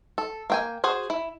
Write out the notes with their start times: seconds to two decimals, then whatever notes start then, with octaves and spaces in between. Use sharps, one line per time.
0.18 A4
0.50 A#3 G5 G#5
0.84 F#4 G#4 C5
1.10 E4